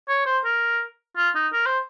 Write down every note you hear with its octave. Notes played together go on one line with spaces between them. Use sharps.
C#5
C5
A#4
F4
D#4
A#4
C5